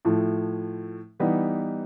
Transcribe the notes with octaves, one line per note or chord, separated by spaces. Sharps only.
A2 F3 A3
E3 G3 B3 D#4